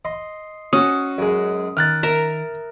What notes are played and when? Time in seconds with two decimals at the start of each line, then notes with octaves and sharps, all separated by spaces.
0.05 D#5 C6
0.73 C#4 F#4 D#6
1.18 F#2 G#3
1.77 D#3 F6 F#6 A6
2.03 A#4 E5 A#5